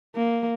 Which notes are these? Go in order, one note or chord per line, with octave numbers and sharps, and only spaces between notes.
A#3